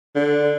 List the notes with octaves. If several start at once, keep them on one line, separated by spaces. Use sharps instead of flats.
D3